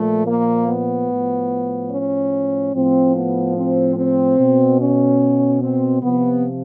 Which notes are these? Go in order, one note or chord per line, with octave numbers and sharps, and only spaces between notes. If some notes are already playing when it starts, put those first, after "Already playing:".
Already playing: A#2 F3 A3
A#3
B3
A2 F3
C#4
A2 F3 C4
B3
C4
C4
B2
C#4
C4
C3 F3 B3